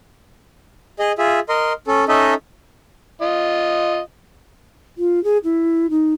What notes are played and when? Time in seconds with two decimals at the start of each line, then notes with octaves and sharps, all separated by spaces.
0.99 G#4 D#5
1.18 F4 G#4 E5
1.49 A#4 D#5 C6
1.87 C#4 A4
2.08 C#4 D#4 A4 D#5 E5
3.21 F4 D#5
4.98 F4
5.24 G#4
5.44 E4
5.90 D#4